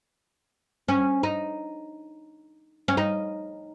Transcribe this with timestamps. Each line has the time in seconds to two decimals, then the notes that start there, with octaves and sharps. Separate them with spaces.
0.88 C#4
1.23 D#4
2.88 C#4
2.97 D#4